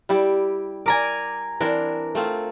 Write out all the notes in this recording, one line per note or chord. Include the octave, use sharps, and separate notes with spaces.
G3 E4 G4
A#4 D5 G#5 A#5 D6
E3 C4 D4 A#4
A3 C4 F4